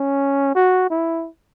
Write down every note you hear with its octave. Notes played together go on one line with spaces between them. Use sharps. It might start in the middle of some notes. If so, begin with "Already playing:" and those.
Already playing: C#4
F#4
E4